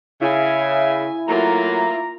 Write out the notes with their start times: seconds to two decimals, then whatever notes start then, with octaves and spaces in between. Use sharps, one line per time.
0.21 C#3 E4 E5 G#5
1.28 F#3 A3 A#3 F4 A#5